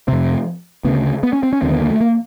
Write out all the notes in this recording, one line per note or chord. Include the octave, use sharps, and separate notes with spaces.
F2 C3 C4
D2 C#3 B3
B3
C#4
C4
C#4
D#2 D3 C4
B3
A#3
A3
A#3